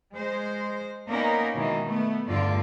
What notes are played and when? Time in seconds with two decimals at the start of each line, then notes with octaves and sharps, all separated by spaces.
0.13 G#3 C5
1.08 A#3 B3 C#4 D#4 A#4 D5
1.54 B2 D#3 E3 G#3
1.86 A3 B3
2.27 E2 G2 D3 F4 D5